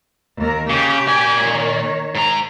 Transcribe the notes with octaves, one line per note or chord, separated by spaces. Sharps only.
D#2 A#4
C#3 G4 G5
A#2 G#5
D#3 C#5
G#2 A#5